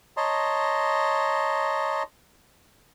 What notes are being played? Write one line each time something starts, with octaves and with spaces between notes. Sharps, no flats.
C#5 D#5 A5 A#5 C6